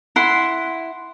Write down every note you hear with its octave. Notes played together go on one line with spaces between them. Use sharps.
E4 F#5 C6